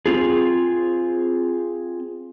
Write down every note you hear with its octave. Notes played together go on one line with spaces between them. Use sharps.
C4 F4 G#4